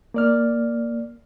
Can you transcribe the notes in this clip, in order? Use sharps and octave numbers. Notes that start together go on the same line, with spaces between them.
A#3 D5 F6